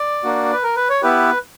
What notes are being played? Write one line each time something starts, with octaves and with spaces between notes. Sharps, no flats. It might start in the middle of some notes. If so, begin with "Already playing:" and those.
Already playing: D5
A#3 D4 F#4
B4
A#4
B4
C#5
B3 E4 G4 B4